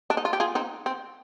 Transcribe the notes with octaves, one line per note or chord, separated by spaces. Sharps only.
D4
D#4
F4
G4
F4 G#4
C4 D#4
C4